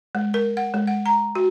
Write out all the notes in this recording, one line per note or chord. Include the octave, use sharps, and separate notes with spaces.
G#3
A#4
F#5
G#3
F#5
A#5
F#4